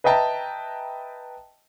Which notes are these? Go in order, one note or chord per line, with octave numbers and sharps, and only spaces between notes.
B4 D#5 E5 G5 A5 A#5